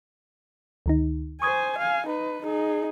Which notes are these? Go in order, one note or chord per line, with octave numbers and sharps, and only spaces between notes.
D2 D#3 D#4
C5 G#5 C#6 D#6 G#6
F5 G#5
D#4 B4
D#4 G#4